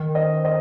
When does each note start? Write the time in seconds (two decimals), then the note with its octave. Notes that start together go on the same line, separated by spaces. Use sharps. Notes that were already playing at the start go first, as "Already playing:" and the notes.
Already playing: D#3
0.15 C5 D#5
0.44 C5 D#5